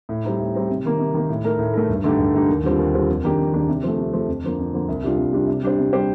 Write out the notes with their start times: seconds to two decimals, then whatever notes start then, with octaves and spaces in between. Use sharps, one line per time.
0.09 A2
0.25 G3 C4 D#4
0.39 A2
0.54 G3 C4 D#4
0.69 C3
0.85 D#3 A#3
0.99 C3
1.14 D#3 A#3
1.29 A2
1.44 A3 D#4 A#4
1.59 A2
1.74 A3 D#4 A#4
1.89 G2
2.04 D3 A3 D#4 G4
2.19 G2
2.34 D3 A3 D#4 G4
2.49 D#2
2.63 D3 G3 C4 F4
2.79 D#2
2.94 D3 G3 C4 F4
3.08 F2
3.24 D#3 A#3 D4 G4
3.39 F2
3.54 D#3 A#3 D4 G4
3.68 C3
3.84 F3 A3
3.98 C3
4.13 F3 A3
4.28 F2
4.44 D3 F3 A#3
4.59 F2
4.73 D3 F3 A#3
4.88 C2
5.03 C3 G3 D4 F4
5.18 C2
5.33 C3 G3 D4 F4
5.47 C3
5.63 G3 D4 G4 C5
5.78 C3
5.93 G3 D4 G4 C5